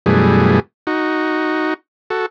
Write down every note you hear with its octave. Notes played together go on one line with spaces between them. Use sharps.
F#2 B2 E3 G3 A3 G#4
D#4 F#4
F#4 A4